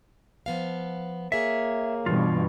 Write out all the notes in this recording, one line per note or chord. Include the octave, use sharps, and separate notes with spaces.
F3 B3 F5
A#3 G#4 C#5 E5
G2 B2 E3 F4